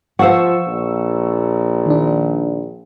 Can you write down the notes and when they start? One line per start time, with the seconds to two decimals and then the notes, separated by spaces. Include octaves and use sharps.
0.19 F3 C5 F5 F#5 C#6 E6
0.67 A#1
1.86 D#3 D4